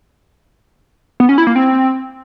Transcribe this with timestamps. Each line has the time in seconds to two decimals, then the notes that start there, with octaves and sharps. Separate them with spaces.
1.20 B3
1.29 C#4
1.38 E4
1.47 A#3
1.56 C4